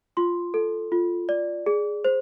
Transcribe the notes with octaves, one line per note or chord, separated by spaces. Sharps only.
F4 C6
A4
F4
D5
G#4
C5